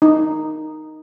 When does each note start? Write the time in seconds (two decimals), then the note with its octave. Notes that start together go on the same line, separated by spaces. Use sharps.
0.02 D#4